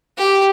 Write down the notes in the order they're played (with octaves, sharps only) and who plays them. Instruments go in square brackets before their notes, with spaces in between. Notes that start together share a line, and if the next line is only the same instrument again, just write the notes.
[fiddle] G4